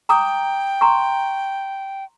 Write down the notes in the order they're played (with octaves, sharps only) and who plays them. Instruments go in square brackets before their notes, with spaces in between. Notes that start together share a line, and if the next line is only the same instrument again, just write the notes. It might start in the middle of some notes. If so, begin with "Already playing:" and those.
[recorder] G5 [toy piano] A#5 D6 D#6
[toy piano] A#5 C6 C#6